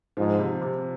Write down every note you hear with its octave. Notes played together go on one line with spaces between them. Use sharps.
G#2 F3
C3
C3